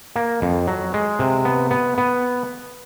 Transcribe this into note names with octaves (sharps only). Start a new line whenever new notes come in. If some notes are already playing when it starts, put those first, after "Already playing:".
A#3
F2
F#3
G#3
C3
B3
B3
B3